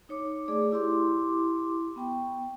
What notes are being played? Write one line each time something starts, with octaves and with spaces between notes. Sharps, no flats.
D#4 C#5 D6
A3 G#4 D5 D6
E4 G4 C6 D6
B3 G5 C#6